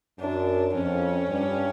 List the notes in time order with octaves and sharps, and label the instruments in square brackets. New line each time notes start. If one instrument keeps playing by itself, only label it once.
[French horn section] F#2 [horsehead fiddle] D4
[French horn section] F2 [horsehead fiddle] C#4
[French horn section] G2